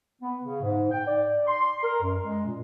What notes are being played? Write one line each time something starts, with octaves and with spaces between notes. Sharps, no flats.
B3
C#3
G#2
G5
D5
C6
A#4
F#2
G#3
A#2